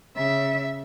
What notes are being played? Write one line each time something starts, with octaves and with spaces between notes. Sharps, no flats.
C#3 E5